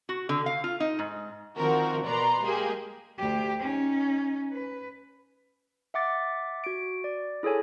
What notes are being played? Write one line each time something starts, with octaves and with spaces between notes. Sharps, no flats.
F#4
D3
F5
F4
D#4
G#2
D#3 F3 C4 F#4 A#4
B2 B4 D5 A#5 C6
G#3 A#3 G4 G#4
D2 G4
C#4 D#4
B4
E5 F#5 D6 A6
F#4 D7
D5
E4 G#4 A4 C#5 G#5